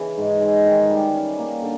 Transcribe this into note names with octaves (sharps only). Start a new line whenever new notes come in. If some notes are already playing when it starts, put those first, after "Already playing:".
Already playing: C#3 E3
G#2
G#3
D#3
G3
C#4
A#3
D3